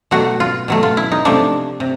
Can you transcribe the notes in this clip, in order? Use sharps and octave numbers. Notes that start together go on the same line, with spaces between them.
B2 F#3 A3 F#4
F4
B2 F#3 A3
F4
E4
D#4
C3 F3 A3 D4
C3